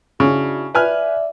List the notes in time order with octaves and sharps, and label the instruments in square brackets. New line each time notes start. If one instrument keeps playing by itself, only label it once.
[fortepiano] C#3 [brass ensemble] D4 E4 F#4
[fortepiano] B4 G#5 F6 [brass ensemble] D5 E5